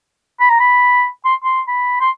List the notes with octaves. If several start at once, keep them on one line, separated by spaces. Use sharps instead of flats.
B5
A#5
B5
C6
C6
B5
C6